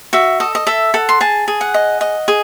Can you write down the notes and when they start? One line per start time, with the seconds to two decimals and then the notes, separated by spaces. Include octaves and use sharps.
0.13 F#4 E5
0.40 A4 D#5
0.55 D#5
0.67 A4 E5
0.94 A4 F#5
1.09 C6
1.21 G#4 A5
1.48 G#4
1.61 F#5
1.74 D#5
2.01 D#5
2.28 G#4